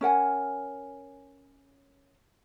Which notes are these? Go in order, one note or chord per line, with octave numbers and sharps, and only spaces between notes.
C#4 A#4 F#5 G#5